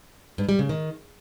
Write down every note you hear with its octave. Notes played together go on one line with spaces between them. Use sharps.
G2
G3
C#3
D#3